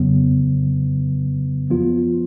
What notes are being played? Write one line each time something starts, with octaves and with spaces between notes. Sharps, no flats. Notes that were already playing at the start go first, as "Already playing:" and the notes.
Already playing: F2 C#3 F#3 B3
F3 B3 F4